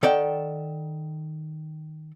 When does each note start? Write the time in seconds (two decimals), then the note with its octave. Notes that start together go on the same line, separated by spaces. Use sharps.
0.03 D#3 A4 D5 F#5 G5